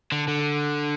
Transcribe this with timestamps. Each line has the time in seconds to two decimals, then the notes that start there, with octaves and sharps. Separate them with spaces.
0.12 D3
0.28 D3